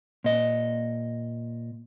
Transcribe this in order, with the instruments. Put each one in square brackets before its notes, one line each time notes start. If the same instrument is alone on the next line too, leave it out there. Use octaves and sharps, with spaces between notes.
[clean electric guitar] A#2 D#5